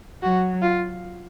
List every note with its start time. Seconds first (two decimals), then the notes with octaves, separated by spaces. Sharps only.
0.23 F#3 F#4
0.62 F4